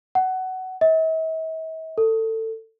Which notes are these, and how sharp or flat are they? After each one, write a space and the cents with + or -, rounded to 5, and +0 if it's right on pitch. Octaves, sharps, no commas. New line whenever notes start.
F#5 +20
E5 -45
A4 +20